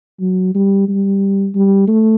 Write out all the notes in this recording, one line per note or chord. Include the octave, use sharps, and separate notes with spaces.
F#3
G3
G3
G3
A3